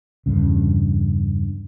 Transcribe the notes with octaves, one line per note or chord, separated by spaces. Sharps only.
E2 G2 C#3